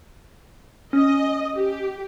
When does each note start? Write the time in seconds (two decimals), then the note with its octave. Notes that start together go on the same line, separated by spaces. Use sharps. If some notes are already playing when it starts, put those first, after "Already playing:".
0.93 C#4 D#5
1.56 G4